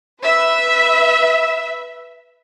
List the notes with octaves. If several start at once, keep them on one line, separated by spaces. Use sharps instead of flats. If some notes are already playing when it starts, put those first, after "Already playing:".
B4 E5